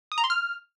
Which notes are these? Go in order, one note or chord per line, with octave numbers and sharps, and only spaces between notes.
D#6
A#5
C6
F6